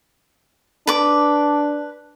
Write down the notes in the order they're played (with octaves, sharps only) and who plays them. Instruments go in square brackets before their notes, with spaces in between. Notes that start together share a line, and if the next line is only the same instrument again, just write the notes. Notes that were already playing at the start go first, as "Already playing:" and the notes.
[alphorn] D4 [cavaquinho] B4 D6